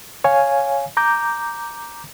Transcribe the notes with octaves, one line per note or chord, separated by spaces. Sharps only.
C#5 F5 G#5
A#5 D6 G6